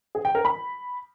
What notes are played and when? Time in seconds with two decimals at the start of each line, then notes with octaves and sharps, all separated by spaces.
0.15 G#4
0.25 G5
0.35 A#4
0.45 B5